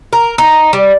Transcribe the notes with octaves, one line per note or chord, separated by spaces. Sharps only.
A#4
D#4
G3